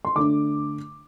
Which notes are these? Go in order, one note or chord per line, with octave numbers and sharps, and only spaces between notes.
C6
D3 A3 D4 D6